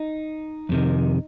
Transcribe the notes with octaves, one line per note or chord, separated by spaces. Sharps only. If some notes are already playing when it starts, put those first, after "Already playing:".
Already playing: D#4
F2 C3 D#3